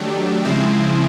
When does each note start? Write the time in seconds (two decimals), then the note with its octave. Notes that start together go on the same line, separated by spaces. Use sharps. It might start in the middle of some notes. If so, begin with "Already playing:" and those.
Already playing: D#3 F#3 A3 D4 G4
0.44 C#3 F3 G#3 C4 E4